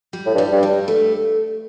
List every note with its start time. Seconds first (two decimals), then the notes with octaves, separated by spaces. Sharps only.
0.13 G3
0.26 A2
0.35 G2
0.38 G3
0.52 G2
0.63 G3
0.88 A3